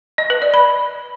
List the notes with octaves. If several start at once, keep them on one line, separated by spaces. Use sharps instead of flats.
D#5
B4
D5
B5